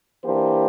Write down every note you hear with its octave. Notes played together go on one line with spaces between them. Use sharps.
E3 A#3 D4 G4 C5